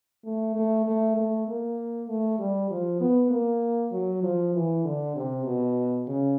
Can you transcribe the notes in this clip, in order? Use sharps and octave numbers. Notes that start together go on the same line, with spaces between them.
A3
A3
A3
A3
A#3
A3
G3
F3
B3
A#3
F#3
F3
E3
D3
C3
B2
C#3